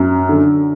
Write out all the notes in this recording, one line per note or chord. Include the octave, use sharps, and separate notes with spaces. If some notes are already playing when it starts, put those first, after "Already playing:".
Already playing: F#2
D3